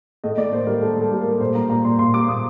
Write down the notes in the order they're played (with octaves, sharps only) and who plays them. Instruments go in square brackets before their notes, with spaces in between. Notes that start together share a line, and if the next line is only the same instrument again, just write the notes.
[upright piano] A2 D#5
A2 D5
A#3 C5
G3 A#4
G3 A4
A2 A4
G3
A#3 A#4
A#2 C5
G3 A#5
A#2 A#5
A#2 C6
A#2 C6
G3 D6
A#2 D#6